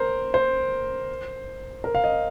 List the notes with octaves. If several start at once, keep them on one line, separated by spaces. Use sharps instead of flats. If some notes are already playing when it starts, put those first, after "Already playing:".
Already playing: A#4 C5
C5
A#4
F5
D#5